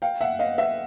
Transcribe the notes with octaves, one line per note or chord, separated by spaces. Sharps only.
F5 G5
E5 F#5
D#5 F5
E5 F#5